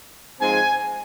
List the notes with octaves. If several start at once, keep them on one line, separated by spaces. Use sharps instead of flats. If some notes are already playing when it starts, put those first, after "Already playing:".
G#2 F3 G#3 C4 G#5